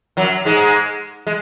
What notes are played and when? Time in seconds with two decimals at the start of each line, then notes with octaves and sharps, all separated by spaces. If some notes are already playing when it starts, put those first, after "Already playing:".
0.17 F#2 F#3
0.45 G#2 G#3
1.27 G#3